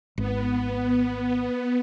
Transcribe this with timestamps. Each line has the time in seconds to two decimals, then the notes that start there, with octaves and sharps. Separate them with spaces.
0.18 G#1 B3